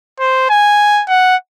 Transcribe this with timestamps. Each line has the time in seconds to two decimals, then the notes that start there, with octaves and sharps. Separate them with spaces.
0.20 C5
0.50 G#5
1.09 F#5